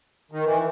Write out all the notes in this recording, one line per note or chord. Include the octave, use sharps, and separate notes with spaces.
D#3
E3